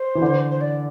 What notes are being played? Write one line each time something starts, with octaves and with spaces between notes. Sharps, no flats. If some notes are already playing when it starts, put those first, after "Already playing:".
Already playing: C5
E3
D3
C5
D5